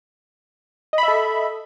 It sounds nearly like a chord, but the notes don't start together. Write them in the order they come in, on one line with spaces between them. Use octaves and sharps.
D#5 B5 E5 A4